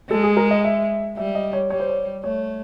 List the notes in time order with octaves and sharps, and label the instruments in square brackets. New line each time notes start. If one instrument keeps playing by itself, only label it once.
[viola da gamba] G#3 [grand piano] A4
[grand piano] G#4
A#4
D#5
E5
[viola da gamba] G3 [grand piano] E5
[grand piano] D#5
C#5
[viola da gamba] G3 [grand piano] C#5
[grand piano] C5
C#5
[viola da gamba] A3 [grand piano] C#5